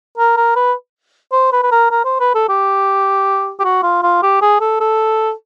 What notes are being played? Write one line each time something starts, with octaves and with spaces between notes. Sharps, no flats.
A#4
A#4
B4
C5
B4
B4
A#4
A#4
C5
B4
A4
G4
G4
F#4
F4
F4
G4
G#4
A4
A4